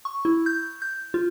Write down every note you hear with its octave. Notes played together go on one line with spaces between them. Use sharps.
C#6
E4
G6
G6
F4